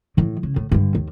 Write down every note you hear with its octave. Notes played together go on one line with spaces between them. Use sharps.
A2 E3
C#3
A2
G2 D3
D#2